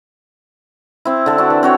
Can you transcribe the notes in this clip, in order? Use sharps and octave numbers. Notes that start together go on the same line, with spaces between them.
C4 E4
D3 A4
D4 F#4
E3
C4 F#4 C#5